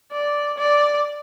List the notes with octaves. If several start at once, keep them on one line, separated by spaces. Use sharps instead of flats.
D5
D5